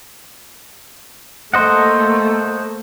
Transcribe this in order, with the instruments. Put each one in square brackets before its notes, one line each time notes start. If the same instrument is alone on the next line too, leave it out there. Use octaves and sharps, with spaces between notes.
[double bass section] A3 A#3 [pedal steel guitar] C5 D#5 F#5